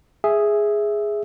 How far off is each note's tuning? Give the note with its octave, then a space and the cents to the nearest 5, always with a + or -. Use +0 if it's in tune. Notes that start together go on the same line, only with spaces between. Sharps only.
G#4 +0 E5 +0